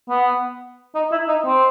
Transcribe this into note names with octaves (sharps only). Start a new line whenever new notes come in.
B3
D#4
E4
D#4
C4